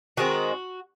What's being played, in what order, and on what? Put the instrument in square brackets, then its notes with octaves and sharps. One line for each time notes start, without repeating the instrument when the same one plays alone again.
[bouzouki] D#3 G#3 C4 F#4